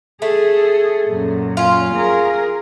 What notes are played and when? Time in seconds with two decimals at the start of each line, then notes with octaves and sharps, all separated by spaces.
0.22 A3 G#4 A4
1.07 F#2 A#2
1.57 C#4 F4
1.93 G#4 A#4